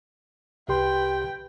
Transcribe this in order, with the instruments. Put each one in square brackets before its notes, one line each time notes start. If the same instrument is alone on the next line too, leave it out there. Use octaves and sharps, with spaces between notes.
[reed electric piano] C2 G4 C6 [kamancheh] B4 G5